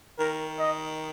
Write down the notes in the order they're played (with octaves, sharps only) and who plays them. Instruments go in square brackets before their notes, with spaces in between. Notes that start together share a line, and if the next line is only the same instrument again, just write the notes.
[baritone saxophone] D#3 [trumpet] A#4
[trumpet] D#5